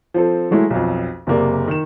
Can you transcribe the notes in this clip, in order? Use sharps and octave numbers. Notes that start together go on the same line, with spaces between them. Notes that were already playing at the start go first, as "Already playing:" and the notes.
F3 C4 A4
E3 F#3 G#3 A3 E4
B1 F2
F#1 C3 A#3 D5
D#3 E7